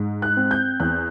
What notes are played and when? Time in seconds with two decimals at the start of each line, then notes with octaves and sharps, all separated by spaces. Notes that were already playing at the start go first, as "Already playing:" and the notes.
Already playing: G#2
0.22 F#6
0.37 C4
0.51 G6
0.80 E2 F#6